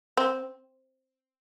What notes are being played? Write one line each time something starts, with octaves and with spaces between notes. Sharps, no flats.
C4